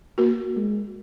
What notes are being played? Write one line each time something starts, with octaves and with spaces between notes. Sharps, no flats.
A#3 F#4 A#4
G#3